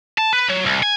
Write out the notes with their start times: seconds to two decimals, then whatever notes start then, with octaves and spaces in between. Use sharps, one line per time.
0.18 A5
0.33 B4
0.49 F#3
0.66 C2
0.83 G#5